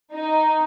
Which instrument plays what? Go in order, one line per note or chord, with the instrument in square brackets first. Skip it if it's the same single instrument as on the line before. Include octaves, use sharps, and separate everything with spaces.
[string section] D#4